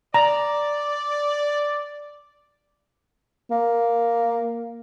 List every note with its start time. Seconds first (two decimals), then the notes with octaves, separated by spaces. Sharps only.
0.14 D5 A#5
3.50 A#3